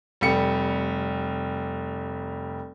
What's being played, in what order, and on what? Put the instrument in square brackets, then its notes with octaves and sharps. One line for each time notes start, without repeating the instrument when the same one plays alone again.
[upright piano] F1 G3 C#7